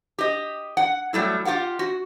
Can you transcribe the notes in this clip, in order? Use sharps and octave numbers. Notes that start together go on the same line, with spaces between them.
G4 D#5
F#5
F#3 G3 A3 E4
F4 G4 F5 F#5
F#4